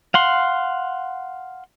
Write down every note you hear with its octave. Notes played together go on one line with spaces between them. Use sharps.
F5 F#5 C6